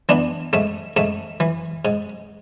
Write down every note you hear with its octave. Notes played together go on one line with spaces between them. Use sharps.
E3 B3 D4
G#2 A3
G#2 A3
E3
G#2